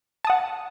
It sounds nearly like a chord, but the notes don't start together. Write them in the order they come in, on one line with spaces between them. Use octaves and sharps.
A5 D#6 F#5